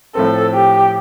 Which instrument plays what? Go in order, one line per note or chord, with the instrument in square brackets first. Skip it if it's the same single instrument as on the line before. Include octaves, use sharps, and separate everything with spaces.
[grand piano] A2 F3 C4 [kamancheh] A4
[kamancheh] G4